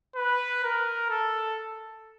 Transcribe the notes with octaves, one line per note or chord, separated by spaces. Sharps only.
B4
A#4
A4